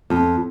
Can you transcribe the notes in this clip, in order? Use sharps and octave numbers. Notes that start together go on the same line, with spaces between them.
F2